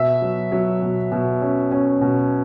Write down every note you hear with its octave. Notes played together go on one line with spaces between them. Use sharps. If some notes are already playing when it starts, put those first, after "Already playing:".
Already playing: B2 E5
F#3
F#3
B2
B2
C#4
C#4
B2